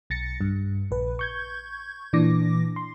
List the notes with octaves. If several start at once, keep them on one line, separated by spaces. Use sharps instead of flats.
B1 A6 A#6 C#7
G2
A#1 B4
C#6 G6 G#6
A#2 E3 D4 D6 A#6
C6